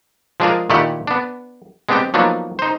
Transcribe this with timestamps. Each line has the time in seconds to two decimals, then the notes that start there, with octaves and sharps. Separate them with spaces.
0.40 F3 G#3 D4 F4 G#4 A#4
0.70 A#2 D#3 A3 E4 G4 F#5
1.07 B3 D4
1.89 G#3 B3 C4 D4 G4 G5
2.14 F3 F#3 A#3 B3 D4 D#4
2.59 D#4 C5